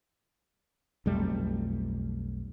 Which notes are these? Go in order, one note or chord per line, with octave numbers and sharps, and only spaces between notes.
B1 F2 G3 A3